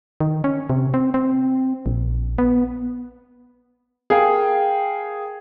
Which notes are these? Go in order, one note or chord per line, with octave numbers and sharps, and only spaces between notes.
D#3
C#4
C3
C4
C4
A#1
B3
G#4 A#4 F5 G5 G#5